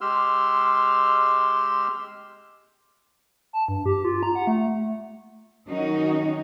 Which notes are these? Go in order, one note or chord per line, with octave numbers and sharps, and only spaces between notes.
G#3 G4 C6 E6 F6
A5
G2
G4
F4
A#5
F#5
A3
D#3 F#3 C#4 D#4 F#4